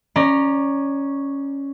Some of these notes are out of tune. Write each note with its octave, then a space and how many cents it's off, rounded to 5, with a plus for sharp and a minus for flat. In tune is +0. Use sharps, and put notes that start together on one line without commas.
C#4 +0 D5 +20 A#5 +0